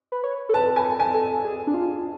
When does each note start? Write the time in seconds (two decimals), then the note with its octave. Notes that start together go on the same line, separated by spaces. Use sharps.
0.12 B4
0.24 C#5
0.49 A4
0.54 B4 A5
0.76 B4 G#5
0.84 A4
1.00 G#5
1.14 A4
1.44 G#4
1.67 D4
1.74 F4